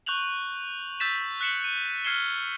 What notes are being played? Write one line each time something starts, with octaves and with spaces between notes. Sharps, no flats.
C#6 F#6 G6 F7 F#7
E6 G6 A6 B6 E7
F#6 B6 C#7 E7 F#7
D#7
F6 G#6 C7 C#7 E7 G7